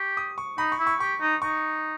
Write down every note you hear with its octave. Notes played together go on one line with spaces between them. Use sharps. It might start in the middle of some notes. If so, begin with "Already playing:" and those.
Already playing: G4 C#6
D#6
C#6
D#4 B5
C#6
E4
C#6
G4 C#6
D#4
D#4 C#6